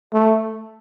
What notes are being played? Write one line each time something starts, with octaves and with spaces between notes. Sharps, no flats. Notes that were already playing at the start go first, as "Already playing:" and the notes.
A3